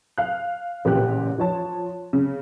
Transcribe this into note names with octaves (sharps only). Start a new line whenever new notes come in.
F5 F#6
A1 A#2 C#3 G4 F#6
F3 C#5 A5
C#3